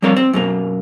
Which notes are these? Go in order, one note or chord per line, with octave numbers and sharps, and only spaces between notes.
F3 G3 C4 A#4 C#5 F5
C4
F#2 B2 A#3